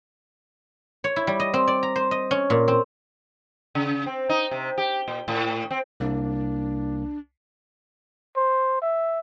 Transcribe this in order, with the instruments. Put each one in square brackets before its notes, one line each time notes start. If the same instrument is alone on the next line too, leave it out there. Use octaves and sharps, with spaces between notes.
[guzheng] C#5
E4
G3
D#5
C4
D5
A#5
C5
D#5
C#4
A#2
C4
[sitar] C#3
C4
D#4
C3
G4
A#2
A2
C4
[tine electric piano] C2 A#3 [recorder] D4
[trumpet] C5
E5